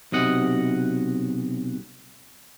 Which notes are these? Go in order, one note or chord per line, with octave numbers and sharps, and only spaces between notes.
B1 C3 D#5 F#5